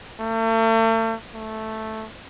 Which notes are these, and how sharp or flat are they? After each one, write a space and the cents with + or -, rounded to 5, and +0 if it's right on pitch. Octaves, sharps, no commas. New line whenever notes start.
A3 +40
A3 -5